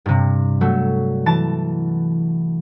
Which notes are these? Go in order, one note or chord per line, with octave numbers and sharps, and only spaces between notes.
G2 C3
F#3 A3
E3 A5